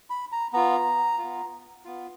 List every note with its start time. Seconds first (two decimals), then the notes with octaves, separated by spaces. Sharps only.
0.10 B5
0.32 A#5
0.53 B3 F4 A#5
1.18 B3 F4
1.85 B3 F4